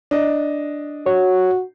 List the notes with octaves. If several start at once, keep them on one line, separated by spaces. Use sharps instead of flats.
D4 D#5
F#4 C#5